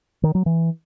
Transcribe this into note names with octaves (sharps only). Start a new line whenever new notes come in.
D#3
F#3
E3